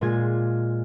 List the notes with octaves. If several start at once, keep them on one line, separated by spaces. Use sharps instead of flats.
A#2 G#3 F4 G#5 G#6